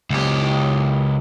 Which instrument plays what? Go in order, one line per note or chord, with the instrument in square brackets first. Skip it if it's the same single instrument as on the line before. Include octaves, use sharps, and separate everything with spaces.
[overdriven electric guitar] C#2 G4